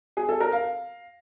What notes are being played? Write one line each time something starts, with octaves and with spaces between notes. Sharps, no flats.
G#4
A4
A#4
F5